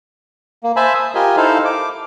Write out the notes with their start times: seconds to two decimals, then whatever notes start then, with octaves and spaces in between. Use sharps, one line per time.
0.63 A#3
0.76 C5 E5 G#5 A5 B5
0.95 D#6
1.15 F4 G4 A#4 D#5 G#5
1.37 D#4 E4 A4 C5 F5
1.65 D6